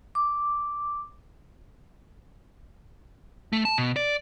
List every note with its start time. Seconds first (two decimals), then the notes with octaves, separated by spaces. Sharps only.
0.15 D6
3.52 A3
3.65 A5
3.78 B2
3.96 D5